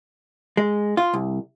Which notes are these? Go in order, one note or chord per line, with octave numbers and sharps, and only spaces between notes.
G#3
F4
C2